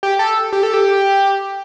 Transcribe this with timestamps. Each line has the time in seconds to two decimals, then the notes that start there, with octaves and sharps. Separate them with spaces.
0.03 G4
0.19 A4
0.53 G4
0.63 A4
0.74 G4